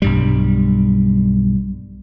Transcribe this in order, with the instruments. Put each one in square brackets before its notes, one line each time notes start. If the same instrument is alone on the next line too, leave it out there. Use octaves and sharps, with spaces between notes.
[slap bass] B1 G2 G3